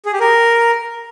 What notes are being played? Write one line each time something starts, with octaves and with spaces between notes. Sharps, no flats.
G#4
G4
A#4